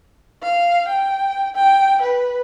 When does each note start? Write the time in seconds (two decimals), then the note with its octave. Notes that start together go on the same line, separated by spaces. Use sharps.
0.43 F5
0.88 G5
1.55 G5
2.01 B4